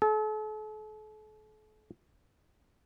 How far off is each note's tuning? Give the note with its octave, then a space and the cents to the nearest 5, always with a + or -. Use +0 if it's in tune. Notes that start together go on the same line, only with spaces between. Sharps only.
A4 -40